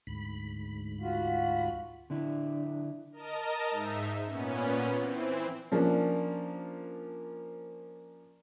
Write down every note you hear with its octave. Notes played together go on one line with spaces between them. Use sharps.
D2 G#2 B5
F4 F#4
D3 D4 E4
A#4 D#5 A5 A#5
G#2 D#4 E5
A#2 B3 C#4
E3 C4
F3 A#3 C#4 D4